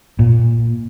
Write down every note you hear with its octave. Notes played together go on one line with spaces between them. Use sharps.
A#2